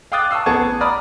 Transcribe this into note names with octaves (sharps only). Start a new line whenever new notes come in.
F5 G5 D6 D#6 F#6 A6
A5 C#6 D#6 E6 C7
A1 B3 G#4 A5 C#6 G#6
D5 A#5 B5 D#6 F6